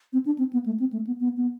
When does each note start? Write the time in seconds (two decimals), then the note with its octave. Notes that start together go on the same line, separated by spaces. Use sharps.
0.13 C4
0.26 D4
0.38 C4
0.53 B3
0.66 A3
0.80 C4
0.93 A3
1.07 B3
1.20 B3
1.37 B3